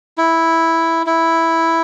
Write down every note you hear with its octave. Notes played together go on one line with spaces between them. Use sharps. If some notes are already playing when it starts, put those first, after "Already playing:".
E4
E4